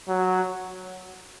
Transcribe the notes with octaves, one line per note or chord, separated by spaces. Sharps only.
F#3